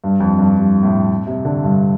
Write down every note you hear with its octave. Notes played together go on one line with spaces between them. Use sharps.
G2
F2
G2
G2
A2
C3
D3
G2